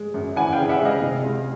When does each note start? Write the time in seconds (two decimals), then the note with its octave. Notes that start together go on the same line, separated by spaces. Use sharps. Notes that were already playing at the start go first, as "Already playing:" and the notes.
Already playing: G#3
0.14 F#2
0.36 E3 F#5 G#5
0.52 F5 G5
0.58 C#3
0.69 E5 F#5
0.81 G#3 D#5 F5
1.02 C3
1.23 C#2